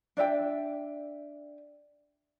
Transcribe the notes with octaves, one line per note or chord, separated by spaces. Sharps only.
D4 D5 E5 G5